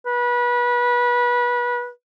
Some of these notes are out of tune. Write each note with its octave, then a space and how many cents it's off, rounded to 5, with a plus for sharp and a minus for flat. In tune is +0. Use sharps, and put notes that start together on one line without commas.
B4 -25